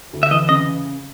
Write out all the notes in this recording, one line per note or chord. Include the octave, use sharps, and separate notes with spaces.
D2
E5
E3 D#5
C#3 D#5